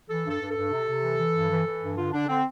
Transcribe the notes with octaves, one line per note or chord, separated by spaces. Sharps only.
E3 A4
G2
A4
G2
A4
G2
C3
C3
E3
E3
G2
E3
E3
G2
D3 F4
D3 D4
D3 C4